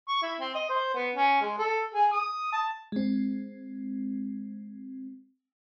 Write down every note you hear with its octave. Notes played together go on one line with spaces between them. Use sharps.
C#6
E4
C4
D#5
C5
B3
C#4
G#3
A4
G#4
D#6
A5
G#3 C4